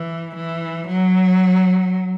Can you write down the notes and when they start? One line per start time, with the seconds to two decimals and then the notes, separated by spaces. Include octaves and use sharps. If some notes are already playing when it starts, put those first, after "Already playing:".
Already playing: E3
0.36 E3
0.88 F#3